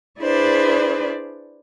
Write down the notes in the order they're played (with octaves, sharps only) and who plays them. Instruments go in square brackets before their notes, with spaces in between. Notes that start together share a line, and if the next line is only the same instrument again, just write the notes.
[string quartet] D4 E4 G#4 B4 C5 D5